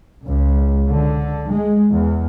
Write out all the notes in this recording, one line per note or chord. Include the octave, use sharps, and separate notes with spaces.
C#2
D3
G#3
E2